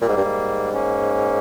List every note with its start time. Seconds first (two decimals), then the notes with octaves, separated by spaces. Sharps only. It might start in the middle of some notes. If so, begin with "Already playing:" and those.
0.01 A#2 G3 A#3
0.09 G#2
0.17 G2
0.25 G#2
0.73 A#3 C#4